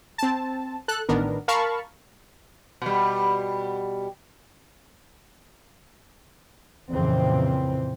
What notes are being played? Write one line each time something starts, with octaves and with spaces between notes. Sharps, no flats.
C4 A5
A4 F#6
A1 D#3 B3 D4 A#4
A#4 F5 A5 B5 C#6
B2 G3
F2 A#2 C#3 E3 C4